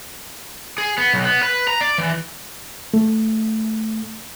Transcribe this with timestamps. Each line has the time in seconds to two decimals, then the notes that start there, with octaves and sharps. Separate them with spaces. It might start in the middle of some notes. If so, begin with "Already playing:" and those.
0.78 G#4
0.98 B3
1.13 B1
1.25 B3
1.43 B4
1.68 A#5
1.81 D5
1.98 E3
2.94 A3